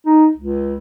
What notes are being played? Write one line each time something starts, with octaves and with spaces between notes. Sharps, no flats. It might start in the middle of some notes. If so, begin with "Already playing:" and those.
D#4
C#2